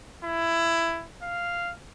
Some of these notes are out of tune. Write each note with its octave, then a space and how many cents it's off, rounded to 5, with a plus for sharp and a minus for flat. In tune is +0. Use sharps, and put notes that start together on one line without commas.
E4 +15
F5 -5